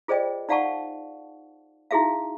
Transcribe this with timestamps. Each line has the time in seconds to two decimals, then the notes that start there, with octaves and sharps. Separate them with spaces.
0.08 F4 G#4 C5 D5 D#5 G5
0.49 D#4 D5 F5 F#5 A5 C#6
1.91 D#4 E4 F#4 G#4 E5 F5